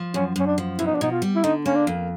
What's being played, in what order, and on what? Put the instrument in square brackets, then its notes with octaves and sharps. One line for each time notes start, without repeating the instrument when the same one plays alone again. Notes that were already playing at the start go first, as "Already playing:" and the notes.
Already playing: [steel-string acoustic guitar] F3
[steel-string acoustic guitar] F#2 [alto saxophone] C#4
[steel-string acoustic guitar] F#2 [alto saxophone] C#4
[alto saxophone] D4
[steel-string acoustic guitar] F3
[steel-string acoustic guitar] B2 [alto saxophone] E4
[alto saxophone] D#4
D4
[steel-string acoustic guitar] B2 [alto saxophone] D#4
[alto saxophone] F4
[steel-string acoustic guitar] G3
[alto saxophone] E4
[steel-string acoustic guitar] D3 [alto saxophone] D#4
[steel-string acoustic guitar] A#3 [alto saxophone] C#4
[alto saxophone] D4
[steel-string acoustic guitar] F2